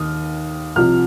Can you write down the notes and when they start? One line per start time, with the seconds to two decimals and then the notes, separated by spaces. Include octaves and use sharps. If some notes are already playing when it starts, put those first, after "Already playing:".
Already playing: D#2 D#3 D#6 F6
0.76 C2 C3 F3 F6